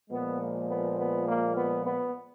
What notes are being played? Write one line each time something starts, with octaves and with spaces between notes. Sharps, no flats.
A#2 F3 G#3 B3
A#3
B3
B3
A#3
B3
B3